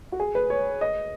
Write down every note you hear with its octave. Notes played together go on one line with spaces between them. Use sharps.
F#4
G#4
B4
C#5
D#5